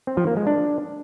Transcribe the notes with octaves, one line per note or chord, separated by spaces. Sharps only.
C4
F3
A#3
G#3
D4